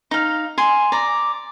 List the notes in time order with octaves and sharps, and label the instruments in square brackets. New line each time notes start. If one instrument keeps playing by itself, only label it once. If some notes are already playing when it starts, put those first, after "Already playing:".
[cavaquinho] D#4 F5
G#5 C6
D5 A#5